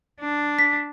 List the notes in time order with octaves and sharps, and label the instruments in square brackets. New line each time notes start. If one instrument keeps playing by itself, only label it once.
[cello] D4
[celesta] B6